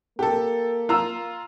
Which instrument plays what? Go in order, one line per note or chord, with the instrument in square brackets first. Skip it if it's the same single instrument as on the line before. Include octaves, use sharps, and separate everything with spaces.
[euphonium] A#3 [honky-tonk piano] G4 A4
[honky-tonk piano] F4 A#5 E6